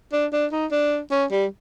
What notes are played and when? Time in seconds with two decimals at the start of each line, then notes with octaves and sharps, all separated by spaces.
0.13 D4
0.33 D4
0.52 D#4
0.72 D4
1.11 C#4
1.32 G3